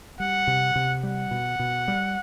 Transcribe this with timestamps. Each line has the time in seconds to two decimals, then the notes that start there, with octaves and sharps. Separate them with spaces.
0.20 G3 F#5
0.47 C3
0.76 C3
1.03 G3 F#5
1.31 B2
1.60 B2
1.88 G3